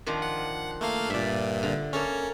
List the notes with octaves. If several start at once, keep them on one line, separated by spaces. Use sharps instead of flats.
D#3 F3 D4
F#5
A3 A#3 F5
G2 A#2 D5 E5
D3
A#3 C#4 A4 C#5